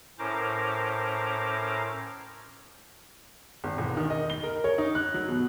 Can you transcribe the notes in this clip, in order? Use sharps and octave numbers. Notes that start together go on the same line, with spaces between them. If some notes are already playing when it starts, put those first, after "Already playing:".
A2 C#4 A#4 C5 A#5 D6
G#1
E1
D#3
D#5
G7
A#4
C#5
D#4
F#6
F#3
B2